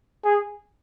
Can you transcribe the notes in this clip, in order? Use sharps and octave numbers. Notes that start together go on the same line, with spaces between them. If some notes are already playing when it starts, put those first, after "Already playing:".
G#4